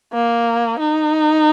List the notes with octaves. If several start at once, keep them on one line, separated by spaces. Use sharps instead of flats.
A#3
D#4